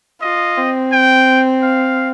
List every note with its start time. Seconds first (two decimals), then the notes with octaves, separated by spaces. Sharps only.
0.22 F4 D#5
0.57 C4
0.92 G5
1.63 F5